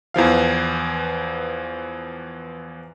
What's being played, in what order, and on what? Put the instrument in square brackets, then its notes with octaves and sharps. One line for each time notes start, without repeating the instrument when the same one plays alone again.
[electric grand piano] E2 E3 F3 F5